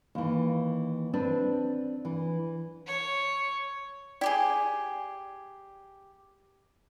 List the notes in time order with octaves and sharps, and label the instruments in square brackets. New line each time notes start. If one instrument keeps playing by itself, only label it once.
[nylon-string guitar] D#2 E3
C4 D4 B4
E3
[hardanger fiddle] C#5
[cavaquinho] E4 G4 G#4 [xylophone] D5 G5